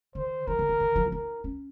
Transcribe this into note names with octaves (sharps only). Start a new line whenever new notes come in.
D#3 C5
F3 A#4
D#3
D#3
D#3
F3
D#4 A#4
C#4